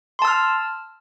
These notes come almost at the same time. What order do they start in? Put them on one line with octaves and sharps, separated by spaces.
C6 A5 E6 F6